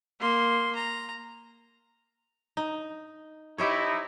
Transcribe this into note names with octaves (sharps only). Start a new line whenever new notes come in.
A#3 C6
A#5
D#4
D#4 E4 G4 C5 C#5